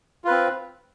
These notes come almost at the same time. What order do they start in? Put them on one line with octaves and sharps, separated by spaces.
F4 B4 C4